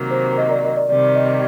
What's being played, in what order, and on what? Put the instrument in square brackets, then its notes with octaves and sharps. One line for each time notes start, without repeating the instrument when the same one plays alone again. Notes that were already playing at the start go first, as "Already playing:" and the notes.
Already playing: [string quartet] C3 D#3 F#3 A#3
[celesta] C5
D#5
D5
D#5
D5
[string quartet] C3 D#3 G3 [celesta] D5
[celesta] D#5